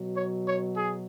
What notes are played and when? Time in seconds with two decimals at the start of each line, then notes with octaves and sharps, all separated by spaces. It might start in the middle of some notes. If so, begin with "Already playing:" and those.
Already playing: B2 F#3
0.16 C#5
0.47 C#5
0.77 G#4